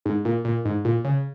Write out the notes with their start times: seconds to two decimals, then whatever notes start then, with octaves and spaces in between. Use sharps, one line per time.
0.05 G#2
0.25 A#2
0.45 A#2
0.65 G#2
0.85 A#2
1.05 C#3